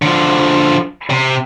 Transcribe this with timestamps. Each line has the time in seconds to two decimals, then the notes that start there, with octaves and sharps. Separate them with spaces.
0.02 D3 F3
1.10 C3